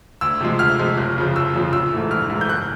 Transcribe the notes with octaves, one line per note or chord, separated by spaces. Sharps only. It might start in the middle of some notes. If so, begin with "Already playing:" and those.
D2 E6
C3 F3 G#3
D2 F6
C3 F3 G#3
F#1
F2 C#3 F3
F#1 E6
F2 C#3 F3
A#1 E6
G#2 E3 A3
A#1 F6
G#2 E3 A3
G6
F#1 F#6